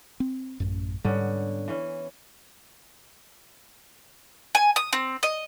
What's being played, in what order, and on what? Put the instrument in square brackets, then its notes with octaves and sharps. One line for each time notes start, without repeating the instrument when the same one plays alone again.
[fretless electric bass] C4
A1 F#2
[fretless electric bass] G#2 G3 [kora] D3 B3 C#4
[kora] E3 C#4
[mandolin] G#5
D#6
C4
D#5